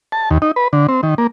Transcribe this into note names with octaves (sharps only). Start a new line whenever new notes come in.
A5
D#2
D#4
B4
D3
C4
D#3
A#3